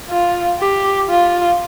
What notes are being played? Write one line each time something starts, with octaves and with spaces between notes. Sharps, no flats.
F4
G4
F4